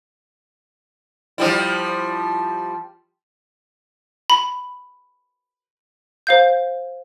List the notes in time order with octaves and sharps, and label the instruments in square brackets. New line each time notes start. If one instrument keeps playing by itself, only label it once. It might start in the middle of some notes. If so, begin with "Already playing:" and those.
[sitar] F3 G3 E4
[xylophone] B5
C5 F5 G6